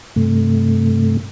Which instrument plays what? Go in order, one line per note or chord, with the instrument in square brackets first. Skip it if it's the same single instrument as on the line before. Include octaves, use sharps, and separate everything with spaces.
[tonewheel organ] G2 C3 A3